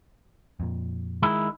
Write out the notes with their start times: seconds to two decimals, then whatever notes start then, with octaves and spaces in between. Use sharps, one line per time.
0.60 F2 A#2
1.22 D#3 G#3 E4